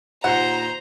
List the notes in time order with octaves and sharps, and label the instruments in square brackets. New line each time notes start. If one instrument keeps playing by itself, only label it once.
[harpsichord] D#2 A#2 [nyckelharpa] C5 [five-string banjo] F#5 [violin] A#5